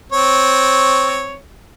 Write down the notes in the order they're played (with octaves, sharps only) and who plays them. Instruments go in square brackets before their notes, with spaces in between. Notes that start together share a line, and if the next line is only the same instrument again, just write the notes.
[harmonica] C4 C#5